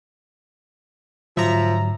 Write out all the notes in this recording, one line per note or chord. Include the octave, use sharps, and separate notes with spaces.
G#2 D3 F3 F#3 E5 A#5